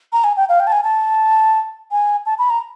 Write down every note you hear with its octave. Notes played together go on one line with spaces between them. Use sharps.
A#5
G#5
G5
F5
G5
A5
G#5
A5
G#5
A5
B5
A#5